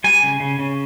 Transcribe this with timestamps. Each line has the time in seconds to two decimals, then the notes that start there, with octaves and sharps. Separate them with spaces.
0.04 G3 G#5
0.23 C#3
0.40 C#3
0.59 C#3